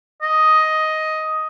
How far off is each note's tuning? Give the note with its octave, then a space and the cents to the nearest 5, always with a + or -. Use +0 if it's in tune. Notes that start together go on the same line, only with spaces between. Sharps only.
D#5 +10